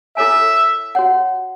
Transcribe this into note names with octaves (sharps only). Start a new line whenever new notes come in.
E4 A4 C#5 E5 G#5
F#4 C#5 F#5